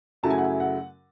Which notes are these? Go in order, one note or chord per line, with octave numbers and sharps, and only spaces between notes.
F#2 C#3 F#3 A3 E4 A5
G#5
F#5
G#5
F#5